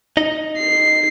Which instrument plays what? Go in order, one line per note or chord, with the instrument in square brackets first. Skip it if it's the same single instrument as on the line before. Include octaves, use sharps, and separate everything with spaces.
[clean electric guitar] D#4 D#5
[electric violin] C7